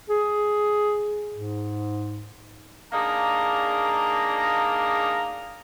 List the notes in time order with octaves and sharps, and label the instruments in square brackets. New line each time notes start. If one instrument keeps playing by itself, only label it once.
[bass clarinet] G#4
G#2
[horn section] A#3 D4 D#4 G#4 A#5